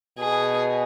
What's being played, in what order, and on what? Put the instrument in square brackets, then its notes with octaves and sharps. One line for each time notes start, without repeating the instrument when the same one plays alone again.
[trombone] B2 [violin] G#4